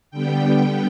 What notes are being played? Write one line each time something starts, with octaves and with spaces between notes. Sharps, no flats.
D3 G3 B3 G5